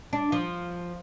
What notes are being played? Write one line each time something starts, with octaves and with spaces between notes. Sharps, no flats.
D4
F3